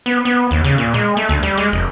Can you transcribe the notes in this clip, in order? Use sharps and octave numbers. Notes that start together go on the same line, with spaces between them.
B3
B3
D#2
C#3
A#2
G#3
A3
D2
G3
G#3
F1